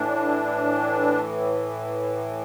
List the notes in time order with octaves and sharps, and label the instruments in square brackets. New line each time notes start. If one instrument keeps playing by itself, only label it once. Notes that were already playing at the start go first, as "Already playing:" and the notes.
Already playing: [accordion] A2 E3 D4